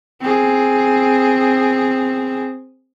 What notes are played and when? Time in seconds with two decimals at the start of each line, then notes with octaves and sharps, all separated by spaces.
0.21 C4 G#4